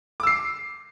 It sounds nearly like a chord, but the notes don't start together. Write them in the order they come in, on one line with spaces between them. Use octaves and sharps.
D6 E6 C7